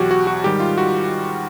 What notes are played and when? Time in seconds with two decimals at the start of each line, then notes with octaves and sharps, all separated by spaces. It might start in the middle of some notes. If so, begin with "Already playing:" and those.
Already playing: E2 B2 F#3 F#4 G4
0.11 F#4
0.27 F#4
0.44 G#2 D#3 G3 G4
0.60 F4
0.78 F#4